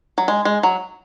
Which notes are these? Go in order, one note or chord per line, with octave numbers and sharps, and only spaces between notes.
F#3
G#3
G#3
F#3